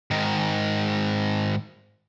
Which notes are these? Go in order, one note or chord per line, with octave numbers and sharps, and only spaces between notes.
G#2 D#3